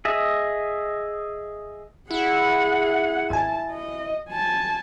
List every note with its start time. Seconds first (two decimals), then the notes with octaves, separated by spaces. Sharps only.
0.05 G#4 D#5 E5
2.11 E4 G#4 F#5
3.30 G#1 G#5 A5
3.71 D#5
4.29 G#5 A5